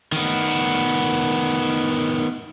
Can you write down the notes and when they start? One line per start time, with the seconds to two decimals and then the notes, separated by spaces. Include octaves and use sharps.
0.12 D#3 B3